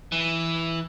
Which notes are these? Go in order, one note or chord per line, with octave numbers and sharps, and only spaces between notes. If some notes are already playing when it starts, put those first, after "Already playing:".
E3